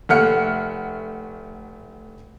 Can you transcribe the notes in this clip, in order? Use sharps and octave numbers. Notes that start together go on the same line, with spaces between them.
F1 A3 F#5 F6 C#7